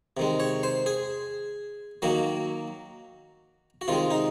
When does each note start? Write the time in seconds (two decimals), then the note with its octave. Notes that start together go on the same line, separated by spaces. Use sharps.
0.17 C3 D#3 G#3
0.40 C#5
0.63 C5
0.86 G#4
2.02 D#3 F#3 A#3 F#4
3.81 F#4
3.88 C3 D#3 G#3 F4
4.11 D#4